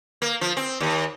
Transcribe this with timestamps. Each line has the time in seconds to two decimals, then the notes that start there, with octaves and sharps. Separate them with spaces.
0.22 A#3
0.41 F3
0.57 C4
0.80 D#2